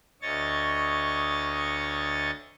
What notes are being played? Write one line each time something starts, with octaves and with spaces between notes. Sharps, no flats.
D2 C#5 D#5 C#6 A6